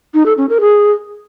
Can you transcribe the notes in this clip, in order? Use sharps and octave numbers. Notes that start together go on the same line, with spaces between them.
D#4
A4
C#4
A#4
G#4